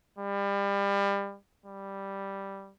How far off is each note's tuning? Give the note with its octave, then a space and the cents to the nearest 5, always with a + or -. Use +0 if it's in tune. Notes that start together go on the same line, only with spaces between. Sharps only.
G3 +30
G3 +0